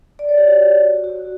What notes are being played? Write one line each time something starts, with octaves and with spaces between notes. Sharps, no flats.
D5
C#5
G4
F#4
F#4